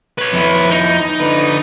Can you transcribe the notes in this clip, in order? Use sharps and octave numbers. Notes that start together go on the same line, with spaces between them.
B4 C#5
F2 E4
D#4
D3 B4